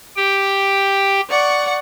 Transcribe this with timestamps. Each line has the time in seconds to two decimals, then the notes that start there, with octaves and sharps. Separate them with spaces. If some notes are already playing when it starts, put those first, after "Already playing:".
0.16 G4 G5
1.29 D5 F#5 C#6